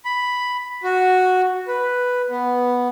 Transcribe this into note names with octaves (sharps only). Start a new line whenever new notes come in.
B5
F#4
B4
B3